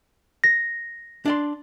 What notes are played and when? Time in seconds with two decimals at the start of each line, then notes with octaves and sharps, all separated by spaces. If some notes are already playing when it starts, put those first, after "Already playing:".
0.44 A#6
1.25 D4 D5 C6